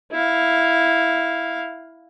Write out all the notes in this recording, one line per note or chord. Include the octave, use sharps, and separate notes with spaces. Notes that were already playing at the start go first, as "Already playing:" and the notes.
E4 F5